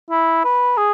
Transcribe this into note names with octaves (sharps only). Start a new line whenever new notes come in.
E4
B4
G#4